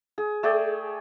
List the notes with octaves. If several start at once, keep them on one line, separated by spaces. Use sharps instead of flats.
G#4
A3 G#4 D5 G5